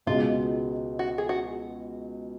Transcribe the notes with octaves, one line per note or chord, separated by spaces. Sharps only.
C#2 B2 G#3 F4
F#4
G#4
F#4